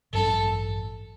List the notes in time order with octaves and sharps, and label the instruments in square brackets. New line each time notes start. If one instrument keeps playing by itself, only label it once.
[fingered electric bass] A1 G2 F#3 C#4 [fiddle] A4